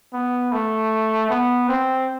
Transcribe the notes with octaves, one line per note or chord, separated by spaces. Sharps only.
B3
A3
B3
C4